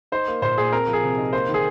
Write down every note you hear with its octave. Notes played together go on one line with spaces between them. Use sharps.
D#4 C5
A#3
A#2 C5
A#2 G#4
C4 A#4
F3
G#4
C3
D#4
A#3 C5
D#3
G#4